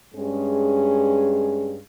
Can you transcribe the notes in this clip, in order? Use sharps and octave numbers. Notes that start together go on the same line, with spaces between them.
G2 G#3 C#4 G#4